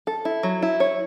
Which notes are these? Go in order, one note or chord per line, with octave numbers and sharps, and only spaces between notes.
A4
E4
F#3
E4
C#5